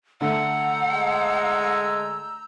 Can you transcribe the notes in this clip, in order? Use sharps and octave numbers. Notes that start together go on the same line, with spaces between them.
D3 A3 F#5 A#5 E6 G6
G#3